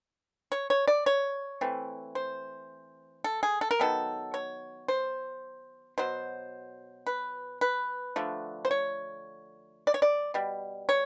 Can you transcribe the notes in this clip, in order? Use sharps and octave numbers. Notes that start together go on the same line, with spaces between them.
C#5
C#5
D5
C#5
E3 A3 C4
C5
A4
G#4
A4
A#4
D#3 F#3 B3 A4
C#5
C5
B2 F#3 C5
B4
B4
D3 F3 A3
C5
C#5
D5
C#5
D5
B2 G3
C#5